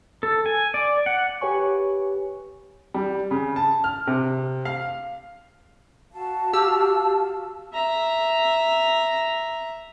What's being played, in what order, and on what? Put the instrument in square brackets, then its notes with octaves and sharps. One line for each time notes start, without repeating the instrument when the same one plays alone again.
[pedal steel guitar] A4
G#5
D5
F#5
[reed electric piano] G4 B4 C#5 G#5 C#6
[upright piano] G3
C#3
A5
F6
C3
F5
[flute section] F#4 F5 A5
[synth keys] G4 E6 F6
[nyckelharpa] E5 A#5